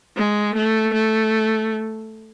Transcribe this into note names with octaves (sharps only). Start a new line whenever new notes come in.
G#3
A3
A3